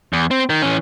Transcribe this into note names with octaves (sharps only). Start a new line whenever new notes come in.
E2
C4
D#3
E3 C#4